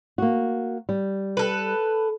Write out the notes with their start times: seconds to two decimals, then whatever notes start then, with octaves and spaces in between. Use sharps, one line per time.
0.18 A#3 F#4
0.89 G3
1.37 A4 B4